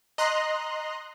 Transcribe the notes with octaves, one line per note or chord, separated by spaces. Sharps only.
D#5 A#5 C6 F#6